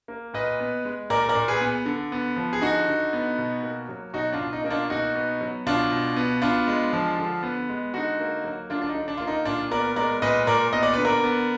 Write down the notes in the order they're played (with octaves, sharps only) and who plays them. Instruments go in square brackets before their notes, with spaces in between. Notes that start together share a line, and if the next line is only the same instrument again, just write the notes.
[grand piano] A#3
A#2 B4 D#5
B3
G#3
A#2 A#4 D5
A#4 D5
A#2
G#4 B4
B3
D3
B3
F3
G#4
D3 D#4 F#4
D3
B3
B2
A#3
F#3
B2 D#4 F#4
D4 F4
B2
D#4
A#3 D#4
D4 F4
B2 D#4 F#4
B3
F#3
B2 D4 F4
B2
B3
B3 D4 F4
G#3
F3
D3
B3
G#3
D3 D#4 F#4
A#3
F#3
D3 D4 F4
D4
D#4
D3
D4
A#3 F4
D#4
A#2 D4 F4
B3 A#4 D5
G#3 A#4 D5
A#2 B4 D#5
A#2 A#4 D5
B3 D#5
D5
D3 B4
A#4 D5
B3